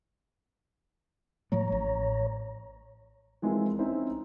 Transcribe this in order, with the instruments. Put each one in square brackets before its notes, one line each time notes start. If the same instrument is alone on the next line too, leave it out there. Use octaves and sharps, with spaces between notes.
[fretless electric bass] A2 F3 A3 [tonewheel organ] C#5 A#5
[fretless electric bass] A1
[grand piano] E3 F3 G#3 C4 E4 A#4
C4 C#4 D#4 E4 C5